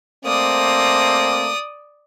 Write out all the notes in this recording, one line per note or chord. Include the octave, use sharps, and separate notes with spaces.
A3 A#3 C4 D5 D#6